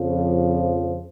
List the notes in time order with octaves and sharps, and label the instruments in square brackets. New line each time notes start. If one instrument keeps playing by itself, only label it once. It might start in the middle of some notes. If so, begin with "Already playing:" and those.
Already playing: [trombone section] F2 C#3 F3